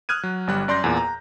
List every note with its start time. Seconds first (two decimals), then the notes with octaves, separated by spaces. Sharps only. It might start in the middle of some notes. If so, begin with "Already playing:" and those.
0.09 D#6 F6 F#6 G#6 D#7
0.23 F#3
0.47 G1 G3 F#6
0.68 F#2 D5 C6 G6 A#6
0.84 E2 A#2
0.97 A#5